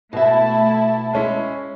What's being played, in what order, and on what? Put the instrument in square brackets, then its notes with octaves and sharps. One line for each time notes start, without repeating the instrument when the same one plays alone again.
[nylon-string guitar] B2 E5 [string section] A3 E4 A5
[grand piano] G#3 C#4 E4